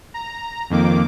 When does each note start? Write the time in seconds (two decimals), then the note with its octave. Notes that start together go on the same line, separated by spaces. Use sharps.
0.14 A#5
0.70 F2 D#3 A#3 D6